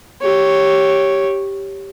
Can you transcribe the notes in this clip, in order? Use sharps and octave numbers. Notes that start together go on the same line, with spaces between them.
G4 C#5